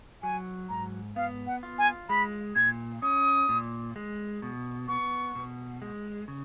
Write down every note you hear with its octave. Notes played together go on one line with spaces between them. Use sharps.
F#3 G#5
G#2 A#5
B3 F5
F#5
F4
G#5
G#3 B5
A#2 G#6
C#4 D#6
A#2
G#3
B2
B3 C#6
B2
G#3
C#3